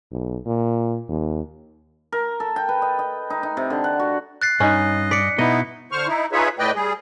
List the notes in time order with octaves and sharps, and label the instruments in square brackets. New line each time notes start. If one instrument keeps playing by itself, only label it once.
[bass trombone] B1
A#2
D#2
[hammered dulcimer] A#4
A4
G5
B4
D#5
D#5
D#4
D#4
C3
D3
F#5
F#4
[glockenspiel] F#6 A6 C7
[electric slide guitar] G2 [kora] C#4 D#4 B4 [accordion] D#5
[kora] D5 [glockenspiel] B6 C#7
[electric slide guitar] B2 [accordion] B3 D#4 E4 [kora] D#5
[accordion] D3 C5 C#6 F6
D#4 E4
D#4 F4 G#4 B4 C#5 E5
A2 A3 B4 D5 D#5 G5
G3 G#4